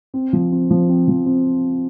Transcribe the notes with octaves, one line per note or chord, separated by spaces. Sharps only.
C4
F3
C4
F3
C4
F3
C4